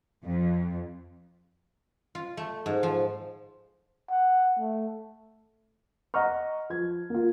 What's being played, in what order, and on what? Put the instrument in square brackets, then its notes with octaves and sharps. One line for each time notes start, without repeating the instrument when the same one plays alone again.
[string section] F2
[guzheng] F4
A3
G#2
F3
[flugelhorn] F#5
A3
[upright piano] D#5 F#5 A#5 C#6 F6
F3 G#6
A#3 F4